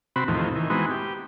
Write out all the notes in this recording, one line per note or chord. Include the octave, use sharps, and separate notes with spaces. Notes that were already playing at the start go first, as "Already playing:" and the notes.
C3 C4 F#4 B5
E2 A2 C3 D#3 F3
D#3 E3
E3 G#3 B3 C4 D#4 F#4
G4